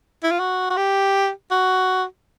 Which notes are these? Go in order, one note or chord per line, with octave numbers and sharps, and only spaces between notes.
E4
F4
F#4
F#4
G4
F#4